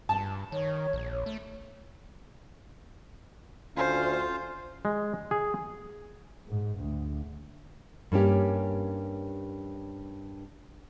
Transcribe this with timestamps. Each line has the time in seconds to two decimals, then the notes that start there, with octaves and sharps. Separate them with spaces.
0.09 G2 A5
0.52 D#3 C#5
0.93 A#1
1.26 A3
3.77 D2 C#4 F4 C5 F5
4.85 G#3
5.31 G#4
6.48 G#2
6.79 D2
8.12 G2 A#3 C#4 G4